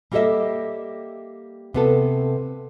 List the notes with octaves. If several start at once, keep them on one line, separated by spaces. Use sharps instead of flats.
G3 A#3 G4 A4 D#5 E5
C3 B3 A4